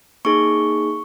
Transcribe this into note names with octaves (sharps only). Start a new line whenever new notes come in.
A#3 D#4 G#4 C#6